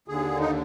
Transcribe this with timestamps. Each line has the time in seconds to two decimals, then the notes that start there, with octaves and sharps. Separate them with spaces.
0.08 D#2 D3 G#4
0.39 D#4